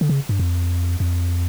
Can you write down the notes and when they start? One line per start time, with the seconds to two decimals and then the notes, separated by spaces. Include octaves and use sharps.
0.01 D3
0.09 C#3
0.29 G2
0.39 F2
1.00 F2